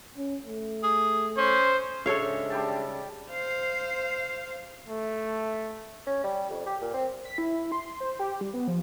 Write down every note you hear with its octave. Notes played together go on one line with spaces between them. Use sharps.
C#4
A3
G#4
C#4 C5
G#2 C#3 G#3 D4 A4 C#5 E5 F5
G3 G4 A5
C5 F5
A3
C#4
G3
F2
G4
A#2
C4
B6
E4
C6
C5
G4
G3
B3
F3